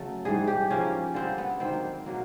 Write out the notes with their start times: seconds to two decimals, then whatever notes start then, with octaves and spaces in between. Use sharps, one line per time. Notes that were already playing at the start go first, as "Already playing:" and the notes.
Already playing: C#3 F#3 A3 A4
0.25 G#2 E3 G3 G#4
0.47 G4
0.70 C#3 F3 A#3 C#4
1.14 D3 G3 A#3 C4
1.38 B3
1.60 G#2 D#3 F#3 A#3 C4
2.06 B2 F#3 A#3